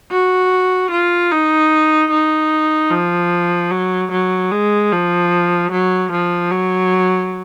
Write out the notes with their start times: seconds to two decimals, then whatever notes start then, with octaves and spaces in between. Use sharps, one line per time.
0.11 F#4
0.91 F4
1.31 D#4
2.11 D#4
2.91 F3
3.71 F#3
4.11 F#3
4.51 G#3
4.92 F3
5.72 F#3
6.12 F3
6.51 F#3